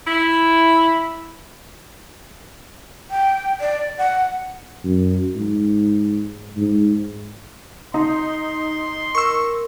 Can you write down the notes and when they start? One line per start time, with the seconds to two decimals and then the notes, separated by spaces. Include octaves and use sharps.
0.05 E4
3.11 G5
3.61 D5
3.98 F#5
4.84 F#2
5.36 G#2
6.57 G#2
7.94 D#4 C6
9.15 A#4 C#6 E6